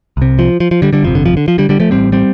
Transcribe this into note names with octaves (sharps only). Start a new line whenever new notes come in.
C2 C3
F3
F3
F3
D3 G3
D3 G3
G1 F2 C3 F3
D3
F3
D3
F3
D3 G3
D3 G3
F3 A3
A1 A2 G3 C4
G3 C4